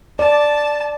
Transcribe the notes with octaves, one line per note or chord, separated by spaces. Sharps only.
D5 A5